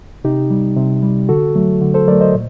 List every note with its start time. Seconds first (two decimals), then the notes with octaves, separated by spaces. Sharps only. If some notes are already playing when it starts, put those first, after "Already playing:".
0.24 C3 D#4 G4
0.50 G3
0.77 C3
1.02 G3
1.29 D3 F#4 A4
1.56 F#3 A3
1.81 D3
1.94 A4 C5
2.07 F#3 A#4 D5
2.11 A3
2.21 C5 D#5
2.34 A#2